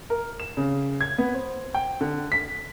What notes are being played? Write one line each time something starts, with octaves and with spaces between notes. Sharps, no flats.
A#4
E7
C#3
G#6
B3
C5
G5
D3
B6